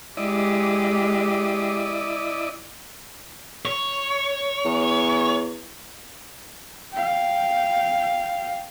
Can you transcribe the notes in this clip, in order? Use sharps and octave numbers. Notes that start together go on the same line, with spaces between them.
G#3 E4 G4 D5 D#5
C#5
E2
F5 G5